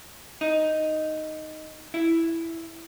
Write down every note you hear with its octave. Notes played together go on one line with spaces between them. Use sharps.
D#4
E4